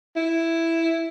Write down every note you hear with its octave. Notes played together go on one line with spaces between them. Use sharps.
E4